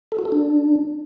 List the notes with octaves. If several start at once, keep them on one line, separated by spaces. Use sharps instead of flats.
A4
F#4
A4
D4